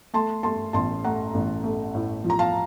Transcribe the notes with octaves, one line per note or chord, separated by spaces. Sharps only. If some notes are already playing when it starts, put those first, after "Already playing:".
A3 A5 C6
A3 A5 C6
A1 A5 C6
A3 F#5 A#5
A1
A3
A2
F3
A#5
F5 A5